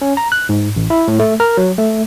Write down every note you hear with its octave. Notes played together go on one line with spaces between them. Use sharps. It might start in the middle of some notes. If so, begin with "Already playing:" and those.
C#4
A#5
F#6
G#2
A1
E4
A2
A3
A#4
F#3
A3